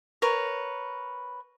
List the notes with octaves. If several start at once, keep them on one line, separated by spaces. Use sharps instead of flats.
A#4 B4 C#5